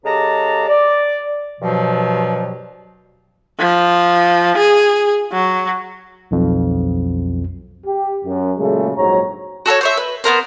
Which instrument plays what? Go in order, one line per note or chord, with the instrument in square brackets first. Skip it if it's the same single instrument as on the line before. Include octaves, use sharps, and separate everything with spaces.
[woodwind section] C#3 G#3 G4 A4 A5 A#5
D5
G2 B2 F3 F#3
[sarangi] F3
G#4
F#3
[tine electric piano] B1 F2
[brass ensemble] G4
F#2
A#2 C#3 F#3 G#3 A3
A#1 G#2 F#3 C#5 A#5
[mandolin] F#4 A4 A#4 C#5
C5 C#5 E5
B4
B3 C#4 A#4 C5